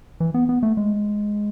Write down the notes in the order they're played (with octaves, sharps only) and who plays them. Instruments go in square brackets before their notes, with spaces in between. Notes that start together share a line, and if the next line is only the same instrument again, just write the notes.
[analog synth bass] E3
B3
B3
A3
G#3